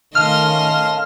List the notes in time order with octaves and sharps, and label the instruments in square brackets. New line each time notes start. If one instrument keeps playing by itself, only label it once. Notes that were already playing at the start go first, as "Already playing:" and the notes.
[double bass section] D#3 A3 C#4 [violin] D#5 C6 [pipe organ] F5 A5 [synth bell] F6